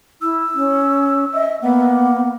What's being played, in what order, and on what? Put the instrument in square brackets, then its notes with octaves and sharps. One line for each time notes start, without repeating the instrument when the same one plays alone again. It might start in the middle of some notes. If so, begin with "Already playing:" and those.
[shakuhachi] E4 [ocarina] E6
[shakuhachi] C#4
[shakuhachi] D#5 [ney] E5
[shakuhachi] A#3 [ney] B3 [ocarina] F#5